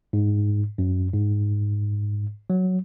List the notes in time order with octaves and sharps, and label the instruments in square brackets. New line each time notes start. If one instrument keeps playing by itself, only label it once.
[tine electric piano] G#2
F#2
G#2
F#3